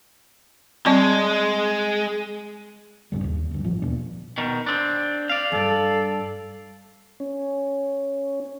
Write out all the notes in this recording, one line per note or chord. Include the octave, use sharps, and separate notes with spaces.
G3 G#3 C4 A5
B1 G2 C#3 G3
D#2
D2 G2
A1 F3
D#2 B2 D4
B2 D#3
C4 D4
D5 F5
E2 G2 A4
C#4